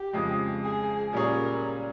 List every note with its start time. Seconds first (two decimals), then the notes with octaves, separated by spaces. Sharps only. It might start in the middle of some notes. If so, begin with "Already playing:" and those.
Already playing: G4
0.13 F2 C#3 G#3
0.64 G#4
1.13 A#2 G3 C#4 G#4 A#4 C#5